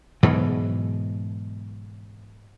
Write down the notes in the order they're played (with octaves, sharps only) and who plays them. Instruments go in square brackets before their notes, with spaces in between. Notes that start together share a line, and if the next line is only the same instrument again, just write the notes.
[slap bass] G#2 B2 E3 F#3